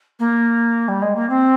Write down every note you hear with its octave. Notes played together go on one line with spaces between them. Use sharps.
A#3
G3
G#3
A#3
C4